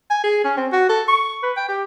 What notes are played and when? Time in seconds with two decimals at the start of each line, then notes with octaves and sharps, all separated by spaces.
0.10 G#5
0.24 G#4
0.44 C#4
0.57 C4
0.73 F#4
0.89 A4
1.08 C#6
1.43 B4
1.57 G5
1.68 G4